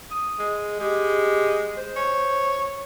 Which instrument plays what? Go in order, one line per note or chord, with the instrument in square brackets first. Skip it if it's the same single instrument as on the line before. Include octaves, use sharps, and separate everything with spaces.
[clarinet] D#6
[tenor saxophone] G#3
[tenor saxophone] G#3 [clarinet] G4
[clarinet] C5
[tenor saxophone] C#5